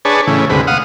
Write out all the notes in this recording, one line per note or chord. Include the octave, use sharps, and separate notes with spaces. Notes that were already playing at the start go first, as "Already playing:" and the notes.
D4 G#4 B4 C#5 A5
A2 C#3 E3
D2 G#2 C3 B4
F5 F#5 D#6